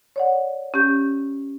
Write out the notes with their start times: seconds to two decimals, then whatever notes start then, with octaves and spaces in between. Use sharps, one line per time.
0.16 C#5 D5 F#5
0.74 C#4 G4 G6